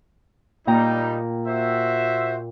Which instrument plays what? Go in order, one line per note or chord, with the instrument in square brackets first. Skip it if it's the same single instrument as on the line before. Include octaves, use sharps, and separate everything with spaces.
[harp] A#2 G5 A#5 [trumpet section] G3 D#4
[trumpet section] F#4 C5 E5